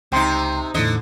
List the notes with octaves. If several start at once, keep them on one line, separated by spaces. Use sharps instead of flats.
C#2 C3 D#4 G5 C6
E2 A2 D3 D#5